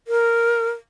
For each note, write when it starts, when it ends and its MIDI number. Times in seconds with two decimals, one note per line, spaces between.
0.08 0.69 70